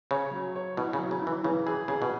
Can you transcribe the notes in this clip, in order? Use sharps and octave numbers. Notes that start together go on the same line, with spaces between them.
C#3 C#5
F#3
C#5
B2 E4
C#3
F#3
C#3
E4
E3
C#3 E3
E3 G#4
C#3 G#4
B2